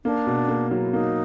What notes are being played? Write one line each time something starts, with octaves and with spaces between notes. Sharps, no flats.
A#3 D4
B2
A#3
F#3
E4
A#3 D#4